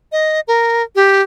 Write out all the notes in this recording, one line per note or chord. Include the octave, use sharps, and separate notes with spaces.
D#5
A#4
G4